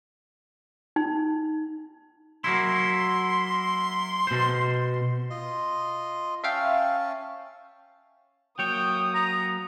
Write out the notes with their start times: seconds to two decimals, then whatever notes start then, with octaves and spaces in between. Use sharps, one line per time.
0.96 D#4
2.44 F#3 A#3 E4 C6
4.27 B2 C5
5.30 F4 D#5 C6
6.44 C#4 E5 F5 G5 A5 C#6
8.59 F#3 A#3 C#5 G5 D#6
9.15 A#5